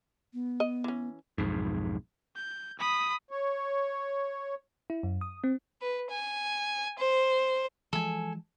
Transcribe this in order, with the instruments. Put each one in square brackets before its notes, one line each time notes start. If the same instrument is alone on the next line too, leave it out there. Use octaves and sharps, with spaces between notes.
[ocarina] B3
[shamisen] D#5
E3 C#4
[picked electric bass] B1 F2 G#2
[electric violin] G6
B5 D#6
[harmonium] C#5
[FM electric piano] E4
F#2
D#6
C4
[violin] B4
G#5
C5
[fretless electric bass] E3 F3 G#3 [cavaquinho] A4 G#5